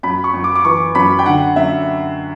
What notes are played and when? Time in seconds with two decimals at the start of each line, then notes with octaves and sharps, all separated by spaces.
0.03 F#2 B5
0.24 C#6
0.34 F#2
0.44 D6
0.55 D6
0.65 E3 C#6
0.95 F#2 B5
1.19 G5
1.26 D3 F#5
1.56 F#2 E5